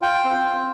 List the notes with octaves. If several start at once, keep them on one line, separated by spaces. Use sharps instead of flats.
F4 G5
C4
F4